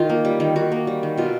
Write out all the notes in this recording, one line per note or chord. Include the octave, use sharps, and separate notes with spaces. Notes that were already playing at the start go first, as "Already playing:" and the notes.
Already playing: D#3 F4
A#3
G3
D#3
D#3 F#4
A#3
G3
D#3
B2 F4